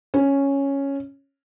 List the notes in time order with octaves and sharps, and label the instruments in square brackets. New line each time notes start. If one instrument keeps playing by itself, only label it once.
[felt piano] C#4